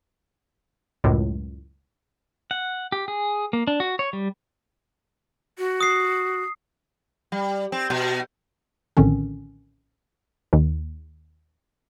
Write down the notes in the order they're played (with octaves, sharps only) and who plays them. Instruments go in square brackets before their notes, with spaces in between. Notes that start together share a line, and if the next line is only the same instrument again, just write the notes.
[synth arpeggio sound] C#2 F#2 A2
[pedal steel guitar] F#5
G4
G#4
A#3
D4
F#4
C#5
G3
[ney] F#4
[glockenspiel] D#6 C7
[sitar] G3
C4
B2
[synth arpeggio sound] A#1 A2 D3 D#3 C4 C#4
D#2